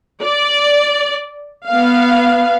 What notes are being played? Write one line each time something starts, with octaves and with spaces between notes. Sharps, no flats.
D5
B3 F5